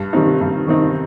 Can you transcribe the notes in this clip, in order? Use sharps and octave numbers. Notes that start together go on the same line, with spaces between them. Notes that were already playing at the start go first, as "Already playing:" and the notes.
Already playing: G2
D#3 G3 C4 D#4
G2
D#3 G3 C4 D#4